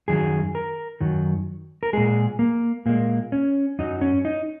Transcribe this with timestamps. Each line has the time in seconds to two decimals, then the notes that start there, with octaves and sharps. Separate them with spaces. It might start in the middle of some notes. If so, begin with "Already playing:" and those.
0.08 F#2 D#3 F#3 G#4
0.55 A#4
1.01 F#2 D#3 F#3
1.83 A#4
1.93 A#2 G#3 G#4
2.39 A#3
2.86 A#2 G#3 A#3
3.32 C#4
3.79 F#2 F#3 D#4
4.01 C#4
4.25 D#4